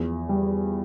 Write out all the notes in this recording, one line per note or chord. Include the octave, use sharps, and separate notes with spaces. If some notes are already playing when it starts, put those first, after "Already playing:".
Already playing: E2 F3
G3